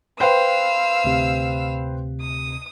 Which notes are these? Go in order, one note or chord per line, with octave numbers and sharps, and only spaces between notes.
B4 C5 F5 G5 E6
D2 C3
D#6